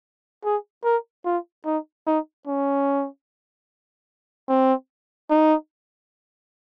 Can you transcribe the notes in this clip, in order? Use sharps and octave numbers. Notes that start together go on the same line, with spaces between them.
G#4
A#4
F4
D#4
D#4
C#4
C4
D#4